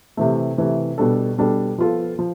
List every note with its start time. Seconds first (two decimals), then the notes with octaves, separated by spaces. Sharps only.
0.17 C3 E3 A3
0.58 C3 E3 A3
0.98 B2 G3 D4 A4
1.38 B2 G3 D4 A4
1.78 F3 B3 F4 A4
2.19 F3